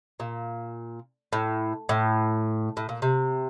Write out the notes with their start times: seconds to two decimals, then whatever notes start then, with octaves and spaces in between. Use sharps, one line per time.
0.20 A#2
1.33 A2
1.89 A2
2.77 A2
2.89 A#2
3.02 C3